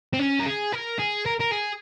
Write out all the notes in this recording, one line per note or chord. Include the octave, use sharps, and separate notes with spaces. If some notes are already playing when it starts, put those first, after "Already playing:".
C4
C#4
A#4
G#4
A#4
G#4
A#4
A#4
G#4